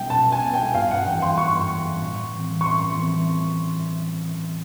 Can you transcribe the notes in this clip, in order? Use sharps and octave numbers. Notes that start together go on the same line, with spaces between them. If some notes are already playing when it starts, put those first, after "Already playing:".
Already playing: B2 G3 B3 G5
B2 A5
G#5
G3 B3
G5
G2 F5
F#5
E3 G3 G5
C6
G2 C#6
E3 G3
A2
E3 G3 C4
C#6
A2 C6
E3 G3 C4